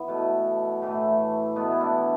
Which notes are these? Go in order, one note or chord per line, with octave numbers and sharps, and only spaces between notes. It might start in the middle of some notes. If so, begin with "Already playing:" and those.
Already playing: E3 B3
B2 A3
A2 E3 A3
B2 A3 B3
E4
D4